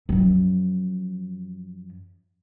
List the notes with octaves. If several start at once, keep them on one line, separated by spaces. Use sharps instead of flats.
F#2 F3